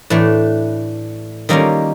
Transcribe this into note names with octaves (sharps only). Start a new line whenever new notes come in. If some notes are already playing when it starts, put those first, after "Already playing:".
A2 E3 A3 D4
D#3 G3 A#3 C#4 F4